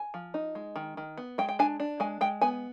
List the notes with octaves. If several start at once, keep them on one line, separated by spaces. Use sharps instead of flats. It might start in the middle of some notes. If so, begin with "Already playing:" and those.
Already playing: G#5
F3
D#4
G#3
D#3
D#3
B3
G#3 G5
G5
D4 G#5
D4
G#3 G#5
G#3 G5
B3 G#5